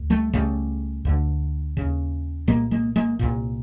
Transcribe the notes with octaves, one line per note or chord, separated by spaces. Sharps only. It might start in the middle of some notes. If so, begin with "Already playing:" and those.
Already playing: D2
G3 A3
C#2 C#3 G3 A3
D2 D3
D#2 C#3
C2 A#2 G#3 A#3
G#3 A#3
G#3 A#3
C2 A#2